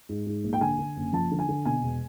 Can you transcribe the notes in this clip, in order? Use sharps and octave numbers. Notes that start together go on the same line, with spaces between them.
G#2
G#2
A#1
G5
D3 G#5
D3
F#1
F3 A5
D3
G#5
D3
B2 G#5
E1